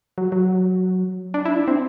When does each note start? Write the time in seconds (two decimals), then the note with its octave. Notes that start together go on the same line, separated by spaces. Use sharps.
0.18 F#3
0.32 F#3
1.34 D4
1.45 E4
1.56 D4
1.68 C4